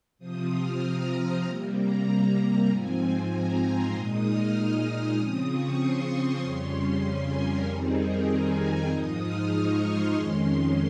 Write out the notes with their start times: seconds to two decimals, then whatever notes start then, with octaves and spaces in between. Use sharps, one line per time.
0.19 C3 F3 C4 D#6
0.50 F6
0.81 A#5
1.43 C3 G3 A#3
1.75 A#5
2.06 A#5
2.68 G#2 F3 C4 G#5
3.31 A#5
3.61 C6
3.92 A#2 G#3 D#4 D#6
4.24 F6
4.86 D#6
5.17 C#3 F3 C4
5.48 C#6
5.79 C6
6.41 F2 C#3 G3 C#4
7.04 G#5
7.35 A#4
7.66 F2 D#3 G3 C4 D#4 G#4
7.97 A#4
8.28 G#5
8.59 A#5
8.90 G#2 F3 G#3 D#4 D#6
9.22 F6
9.53 C#6
9.84 C6
10.15 F2 D#3 G#3 C#4